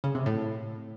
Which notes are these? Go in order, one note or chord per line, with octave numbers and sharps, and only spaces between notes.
C#3
C3
A2